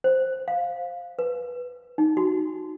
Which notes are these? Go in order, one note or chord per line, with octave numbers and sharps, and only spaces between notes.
C5
F5
B4
D#4
F#4